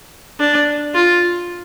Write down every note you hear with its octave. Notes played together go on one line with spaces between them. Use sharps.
D4
F4